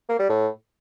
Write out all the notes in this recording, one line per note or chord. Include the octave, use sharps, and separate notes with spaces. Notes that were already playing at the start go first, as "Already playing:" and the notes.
A#3
G3
A2